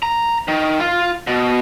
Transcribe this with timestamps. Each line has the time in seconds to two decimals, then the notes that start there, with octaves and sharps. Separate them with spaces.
0.03 A#5
0.48 D#3
0.80 F4
1.27 B2